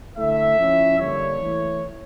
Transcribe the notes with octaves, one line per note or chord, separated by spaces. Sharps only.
D3 A3 E4 E5
F3 C#4 E4
D3 G3 A#3 D4 C#5
E3 A3 E4